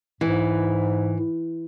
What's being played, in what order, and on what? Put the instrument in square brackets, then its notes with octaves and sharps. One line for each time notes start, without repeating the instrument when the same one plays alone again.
[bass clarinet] G#2 [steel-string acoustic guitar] E3